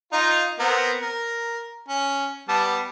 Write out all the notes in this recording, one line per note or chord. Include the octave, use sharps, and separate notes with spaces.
D#4 F4 A#5
B3 C4 A#4
A#4
C#4
G3 B3 A5